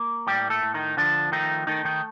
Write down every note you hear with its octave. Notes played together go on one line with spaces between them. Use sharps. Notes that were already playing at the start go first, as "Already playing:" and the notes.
Already playing: A#3
A2 G3 G4
A3 A4
A2
D#3 D#4
D3 F3 D4
D#3 A3 D#4
D#3 A3 D#4
D#3 D#4